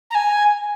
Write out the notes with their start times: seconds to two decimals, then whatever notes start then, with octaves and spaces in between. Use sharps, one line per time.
0.10 A#5
0.15 G#5